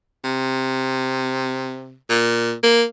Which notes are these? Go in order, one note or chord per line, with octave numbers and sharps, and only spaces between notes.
C3
A#2
A#3